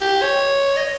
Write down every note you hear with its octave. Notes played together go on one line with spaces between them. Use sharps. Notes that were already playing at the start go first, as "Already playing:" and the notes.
G4
C#5
D#5